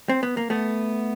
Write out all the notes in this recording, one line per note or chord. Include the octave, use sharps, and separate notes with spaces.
C4
B3
A#3
A3 B3